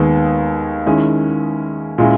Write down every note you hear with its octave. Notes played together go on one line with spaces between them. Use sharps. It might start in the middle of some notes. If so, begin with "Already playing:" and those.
Already playing: D#2 D#3 G#3 B3 D#4
D#3 G#3 C#4 E4
A#2 G#3 C#4 E4